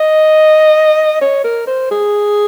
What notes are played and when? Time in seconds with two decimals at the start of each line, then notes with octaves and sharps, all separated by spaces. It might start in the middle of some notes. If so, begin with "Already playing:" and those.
Already playing: D#5
1.21 C#5
1.44 A#4
1.67 C5
1.91 G#4